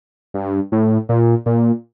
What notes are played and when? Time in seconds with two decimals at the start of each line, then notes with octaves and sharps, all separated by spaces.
0.34 G2
0.72 A2
1.09 A#2
1.46 A#2